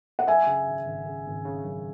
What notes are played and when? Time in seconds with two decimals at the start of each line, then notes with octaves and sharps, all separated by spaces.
0.19 F#5
0.27 F#2 E5 G#5
0.47 C#3
0.67 G#1
0.86 G#1
1.06 C#3
1.26 G#1
1.45 C#3
1.64 F#2